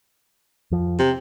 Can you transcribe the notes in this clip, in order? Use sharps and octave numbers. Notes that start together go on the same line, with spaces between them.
F2 F3
C3